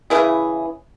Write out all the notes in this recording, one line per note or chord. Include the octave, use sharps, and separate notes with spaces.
C#3 E3 E4 G#4